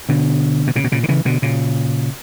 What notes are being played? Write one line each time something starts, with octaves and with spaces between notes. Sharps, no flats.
B2 D3
B2
A#2 C#3
B2
A#2 C#3
D3
C#3 E3
B2 D3
A#2 C#3